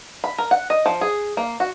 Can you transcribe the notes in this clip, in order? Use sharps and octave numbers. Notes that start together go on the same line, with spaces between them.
B5
A#4
F#5
D#5
F3
G#4
A#3
F#4